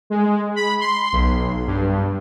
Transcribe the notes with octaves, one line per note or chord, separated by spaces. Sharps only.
G#3
B5
C6
B1
G2